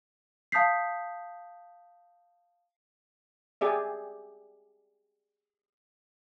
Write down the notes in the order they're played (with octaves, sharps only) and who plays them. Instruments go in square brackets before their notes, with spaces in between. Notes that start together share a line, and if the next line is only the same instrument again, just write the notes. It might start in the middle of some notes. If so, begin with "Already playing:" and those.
[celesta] F5 A5 D#6 G6 B6 C7
[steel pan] G4 G#4 D5 E5